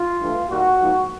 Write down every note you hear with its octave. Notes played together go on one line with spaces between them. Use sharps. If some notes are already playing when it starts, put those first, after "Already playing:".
Already playing: F4
G2 E3 A3
D#2 D#3 G3 A#3 F#4
G#2 F3 A#3